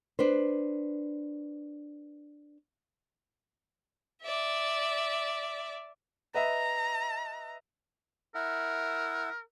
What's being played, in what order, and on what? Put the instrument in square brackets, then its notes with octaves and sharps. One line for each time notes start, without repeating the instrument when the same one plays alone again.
[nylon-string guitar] D4 B4 C5
[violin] D5 E5
[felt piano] B4 D#5 E5 [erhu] A#5
[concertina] E4 E5 F#5 [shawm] A#4